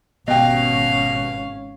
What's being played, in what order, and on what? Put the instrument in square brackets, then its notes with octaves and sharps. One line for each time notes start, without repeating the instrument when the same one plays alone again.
[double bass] G#1 C#4 [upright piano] B2 G4 [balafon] D#5 G5 [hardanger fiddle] F5